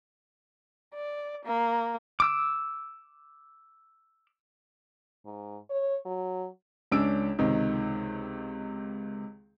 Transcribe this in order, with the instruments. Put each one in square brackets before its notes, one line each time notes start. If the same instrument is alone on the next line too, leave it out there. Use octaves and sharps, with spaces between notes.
[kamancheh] D5
A#3
[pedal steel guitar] D6 E6
[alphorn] G#2
C#5
F#3
[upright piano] C#2 C#4 D4 E6 D7
C#2 C3 D#3